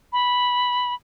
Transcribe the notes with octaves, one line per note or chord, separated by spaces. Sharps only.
B5